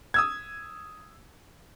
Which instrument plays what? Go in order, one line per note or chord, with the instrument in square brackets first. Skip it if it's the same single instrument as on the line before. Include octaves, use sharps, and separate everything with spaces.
[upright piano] D#6 E6 G#6